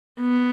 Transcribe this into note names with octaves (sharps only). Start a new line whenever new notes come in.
B3